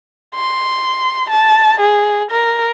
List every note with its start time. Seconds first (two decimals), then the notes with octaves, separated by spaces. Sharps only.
0.35 C6
1.30 A5
1.80 G#4
2.31 A#4